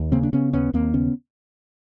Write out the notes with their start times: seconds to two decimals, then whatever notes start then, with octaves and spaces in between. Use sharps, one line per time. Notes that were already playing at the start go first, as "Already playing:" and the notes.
Already playing: D#2
0.12 C#3 A#3 C4
0.23 D4
0.33 C#3 B3 C#4
0.53 D#2 B3 C#4
0.73 D#2 A#3 C4
0.94 C#3 B3 C#4